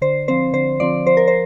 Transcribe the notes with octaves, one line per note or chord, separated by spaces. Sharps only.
D3 C5
F3 C4 C5
D3 C5
F3 C4 D5
F3 C5
A#4
C5